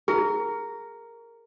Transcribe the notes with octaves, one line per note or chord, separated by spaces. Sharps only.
G#4 A#4